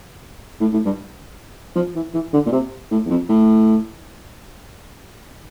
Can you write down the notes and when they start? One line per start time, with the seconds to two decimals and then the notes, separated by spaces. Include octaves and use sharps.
0.60 A2
0.73 A2
0.85 G2
1.76 F3
1.95 E3
2.14 E3
2.33 D3
2.46 A#2
2.52 C3
2.91 A2
3.06 E2
3.10 F2
3.29 A2